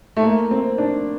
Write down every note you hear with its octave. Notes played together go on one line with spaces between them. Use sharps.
A3
A#3
C4
D4